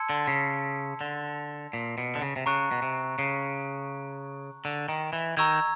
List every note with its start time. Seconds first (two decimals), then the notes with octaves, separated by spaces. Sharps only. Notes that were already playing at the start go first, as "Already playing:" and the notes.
Already playing: A5 C6 E6 G#6 C#7
0.09 D3
0.27 C#3
1.01 D3
1.73 A#2
1.98 B2
2.15 D3
2.22 C#3
2.36 C3
2.46 C#3 A#5 C#6 F#6
2.71 B2
2.82 C3
3.19 C#3
4.65 D3
4.89 D#3
5.13 E3
5.37 D#3 A#5 C#6 E6 G#6